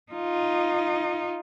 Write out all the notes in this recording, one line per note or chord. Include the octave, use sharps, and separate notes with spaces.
D#4 F4